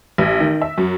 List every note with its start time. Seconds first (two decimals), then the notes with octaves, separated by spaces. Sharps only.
0.18 A1
0.40 D#3
0.62 E5
0.78 F#2